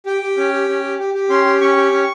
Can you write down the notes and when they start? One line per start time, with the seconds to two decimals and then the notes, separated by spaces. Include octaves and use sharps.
0.06 G4 G5
0.22 G4
0.37 C#4
0.53 G4
0.68 C#4
0.83 G4
0.99 G4
1.14 G4
1.30 C#4 C6
1.45 G4
1.61 C#4 C#6
1.76 G4
1.92 C#4